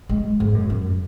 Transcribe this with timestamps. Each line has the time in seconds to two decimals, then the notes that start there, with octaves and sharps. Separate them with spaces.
0.09 G#3
0.40 G#2
0.54 F#2
0.70 F#2